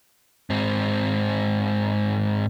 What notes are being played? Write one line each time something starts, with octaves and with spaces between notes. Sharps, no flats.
G#2 C4